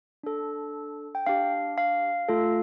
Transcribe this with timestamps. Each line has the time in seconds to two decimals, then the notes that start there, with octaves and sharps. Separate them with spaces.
0.23 D4 A4
1.15 G5
1.26 D4 G4 F5
1.78 F5
2.29 A3 F4 A4